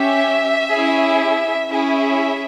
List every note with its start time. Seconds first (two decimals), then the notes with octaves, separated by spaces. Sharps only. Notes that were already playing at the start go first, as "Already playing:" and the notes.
Already playing: C#4 G4 E5
0.73 C#4 E4 G#4
1.69 C#4 E4 G#4 E5